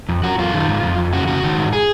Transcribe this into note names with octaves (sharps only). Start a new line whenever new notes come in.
F2
F#2 F#4
F#2 F4
D#3
G#2
F2
F2
C#3 F#4
C#3 F#4
D#3
G#2
G#4